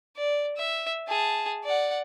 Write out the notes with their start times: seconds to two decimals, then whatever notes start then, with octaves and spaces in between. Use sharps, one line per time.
0.17 D5
0.56 E5
1.08 G#4 A5
1.64 D5 F#5